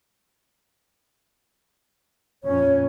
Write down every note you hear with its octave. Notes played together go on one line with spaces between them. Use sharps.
F2 A#2 C#4 C#5